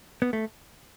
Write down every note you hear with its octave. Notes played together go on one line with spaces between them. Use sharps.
B3
A3